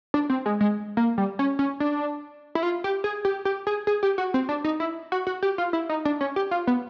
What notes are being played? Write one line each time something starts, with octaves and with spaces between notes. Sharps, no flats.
D4
C4
G#3
G#3
A#3
G3
C#4
C#4
D4
E4
F4
G4
G#4
G4
G4
G#4
G#4
G4
F#4
C4
D4
D#4
E4
F#4
F#4
G4
F4
E4
D#4
D4
C#4
G4
F4
B3